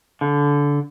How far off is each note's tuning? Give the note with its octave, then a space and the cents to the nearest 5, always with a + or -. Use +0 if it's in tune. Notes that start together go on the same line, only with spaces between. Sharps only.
D3 -20